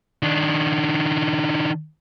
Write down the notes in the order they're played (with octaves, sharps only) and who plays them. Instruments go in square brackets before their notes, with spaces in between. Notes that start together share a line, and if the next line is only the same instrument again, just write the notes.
[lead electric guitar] D#3 D4